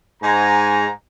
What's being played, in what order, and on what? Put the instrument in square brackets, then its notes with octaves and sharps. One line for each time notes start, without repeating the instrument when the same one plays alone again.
[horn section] G#2 G#5 A#5